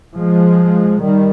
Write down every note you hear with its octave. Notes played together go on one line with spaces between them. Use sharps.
F3 G#3
D#3 G3